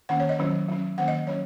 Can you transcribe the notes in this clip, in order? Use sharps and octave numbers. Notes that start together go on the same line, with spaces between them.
D#3 A#3 C#4 F#5
C#5
D#5
D#3 F#3 C#4
F#3 C#4
D#3 A#3 C#4 F#5
D#5
F#3 C#4 C#5